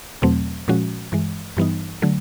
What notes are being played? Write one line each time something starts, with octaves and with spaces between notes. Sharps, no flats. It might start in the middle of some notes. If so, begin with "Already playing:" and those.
E2 B2 F#3 A3 C4
A#2 F3 G#3 C#4 F#4
G2 E3 G#3
G2 E3 G3 B3 D#4
D3 F#3 A3